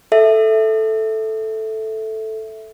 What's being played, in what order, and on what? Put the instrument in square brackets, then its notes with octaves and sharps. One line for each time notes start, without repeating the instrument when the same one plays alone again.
[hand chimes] A4 E5